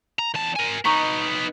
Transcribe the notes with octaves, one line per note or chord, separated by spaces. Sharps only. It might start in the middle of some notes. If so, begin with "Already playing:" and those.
A#5
E2 A5
A#4 G#5
B3 D#4 A#5 C#6